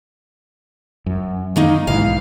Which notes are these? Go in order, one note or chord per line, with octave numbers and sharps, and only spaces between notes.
F#2
D#3 A#3 D#4
B1 G#2 E3 F5